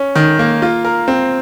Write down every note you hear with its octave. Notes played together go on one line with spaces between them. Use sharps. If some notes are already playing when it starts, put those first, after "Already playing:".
Already playing: C#4
D#3
A#3
F4
A#4
C4